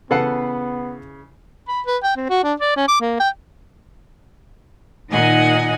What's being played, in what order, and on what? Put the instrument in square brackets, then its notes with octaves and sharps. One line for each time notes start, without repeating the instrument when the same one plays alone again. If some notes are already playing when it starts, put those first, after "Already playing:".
[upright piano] C#3 E3 C7 [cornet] B3 [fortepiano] A4 B4 F#5
[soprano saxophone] B5
B4
G5
C4
F#4
D4
D5
C#4
D6
A#3
G5
[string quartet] A#2 D#3 D#4 D#5 F#5 G#5